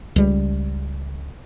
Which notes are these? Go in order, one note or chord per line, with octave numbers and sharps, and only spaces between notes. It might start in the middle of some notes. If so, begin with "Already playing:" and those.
C#2 G3